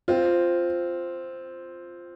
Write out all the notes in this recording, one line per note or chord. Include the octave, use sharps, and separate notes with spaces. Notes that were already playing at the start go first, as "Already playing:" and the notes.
C4 F4